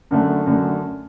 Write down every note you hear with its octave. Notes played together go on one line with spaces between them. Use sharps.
F#2 D3 A3
F#2 D3 A3